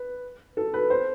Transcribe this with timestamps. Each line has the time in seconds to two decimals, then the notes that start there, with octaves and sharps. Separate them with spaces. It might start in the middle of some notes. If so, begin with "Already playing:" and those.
Already playing: B4
0.57 A4
0.74 B4
0.90 C5